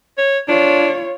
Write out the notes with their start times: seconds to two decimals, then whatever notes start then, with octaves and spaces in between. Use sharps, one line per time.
0.18 C#5
0.48 D4 F4 C#5